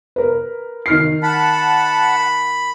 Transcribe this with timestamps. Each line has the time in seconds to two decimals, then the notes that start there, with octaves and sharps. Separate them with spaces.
0.16 A#4 B4
0.86 D#3 F6 C7
1.23 F#5 A5 B5